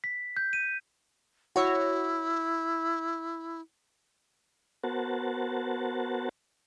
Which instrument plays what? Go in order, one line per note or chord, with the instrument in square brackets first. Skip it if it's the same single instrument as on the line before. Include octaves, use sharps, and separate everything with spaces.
[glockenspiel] B6
G6
D#7
[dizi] E4 [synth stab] F#4 C#5
[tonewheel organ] B3 F#4 A#4 C5 F#5 A5